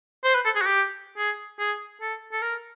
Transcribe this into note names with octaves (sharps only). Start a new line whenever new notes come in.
C5
B4
A4
G#4
F#4
G4
G#4
G#4
A4
A4
A#4